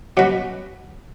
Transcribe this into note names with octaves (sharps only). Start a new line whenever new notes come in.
B2 F#3 C#4 F#4 B4